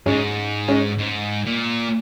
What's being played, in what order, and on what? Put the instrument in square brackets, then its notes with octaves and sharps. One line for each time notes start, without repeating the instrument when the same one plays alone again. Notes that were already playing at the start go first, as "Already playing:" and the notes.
[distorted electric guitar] G#2 [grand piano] G#3 C#4
[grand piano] G#3 C#4
[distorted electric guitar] G#2
A#2